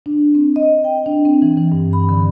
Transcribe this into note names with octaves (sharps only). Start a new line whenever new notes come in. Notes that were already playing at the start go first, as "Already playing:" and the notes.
D4
C4
D#5
G5
D4
C4
E3
E3
G2
B5
D3